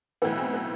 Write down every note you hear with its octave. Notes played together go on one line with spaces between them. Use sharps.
B1 A2 E3 B3
C4
B3